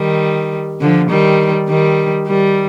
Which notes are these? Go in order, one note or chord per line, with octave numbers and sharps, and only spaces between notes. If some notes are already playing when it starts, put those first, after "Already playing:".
Already playing: D#3 G3
D3 F3
D#3 G3
D#3 G3
D#3 G3